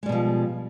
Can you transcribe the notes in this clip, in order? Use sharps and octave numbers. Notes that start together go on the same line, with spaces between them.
B2 F3 G3 G#3